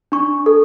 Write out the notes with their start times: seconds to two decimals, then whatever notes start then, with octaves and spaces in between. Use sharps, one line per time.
0.12 D4 C#6
0.46 A4